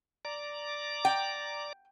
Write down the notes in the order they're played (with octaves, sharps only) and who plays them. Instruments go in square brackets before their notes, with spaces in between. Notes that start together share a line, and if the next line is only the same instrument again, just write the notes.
[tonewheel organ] D5 A#5 D6
[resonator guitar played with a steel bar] G5